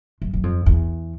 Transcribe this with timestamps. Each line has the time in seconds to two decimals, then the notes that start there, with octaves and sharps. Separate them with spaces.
0.22 F#2
0.34 F#2
0.43 F2
0.66 E2